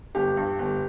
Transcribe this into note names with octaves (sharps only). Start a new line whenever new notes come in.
G1 G4
G2
G1